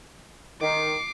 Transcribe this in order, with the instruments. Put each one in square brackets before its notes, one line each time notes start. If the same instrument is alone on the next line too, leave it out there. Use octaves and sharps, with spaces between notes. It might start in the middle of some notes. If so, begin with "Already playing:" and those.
[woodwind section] D#3 [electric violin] D6 C7